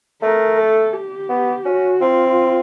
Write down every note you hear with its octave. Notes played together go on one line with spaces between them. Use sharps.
A3 A#4
A4
G4
B3
C#4 F#4
C4 F4